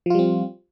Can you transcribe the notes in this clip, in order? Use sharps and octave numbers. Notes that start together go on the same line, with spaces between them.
F3 G3 C4 F4